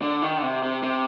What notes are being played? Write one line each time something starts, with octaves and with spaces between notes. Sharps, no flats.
D3
D#3
D3
C3
C3
C3